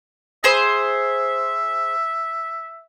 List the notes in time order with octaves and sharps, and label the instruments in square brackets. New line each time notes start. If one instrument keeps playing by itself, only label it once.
[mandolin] G#4 C5 [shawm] E5